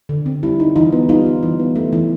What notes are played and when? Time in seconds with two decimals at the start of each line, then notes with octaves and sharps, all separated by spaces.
0.09 D3
0.26 C4
0.43 G3 E4
0.60 D#4
0.76 E3 D#4 F4
0.93 B3
1.09 G3 D#4 F4
1.26 D#4
1.43 E3
1.59 B3
1.76 A3
1.93 E3